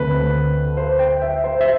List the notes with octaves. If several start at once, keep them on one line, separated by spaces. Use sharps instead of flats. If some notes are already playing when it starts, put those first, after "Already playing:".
Already playing: D2 D3 A3 C4 B4
C5
G5
E5
C5
E5